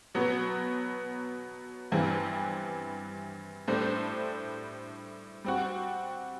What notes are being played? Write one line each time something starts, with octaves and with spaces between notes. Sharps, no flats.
B2 F#3 B3
G2 E3 G3 C4
A2 G3 D4 A4 C5
G3 C4 F#4